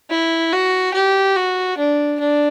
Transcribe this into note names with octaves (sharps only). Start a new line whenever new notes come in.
E4
F#4
G4
F#4
D4
D4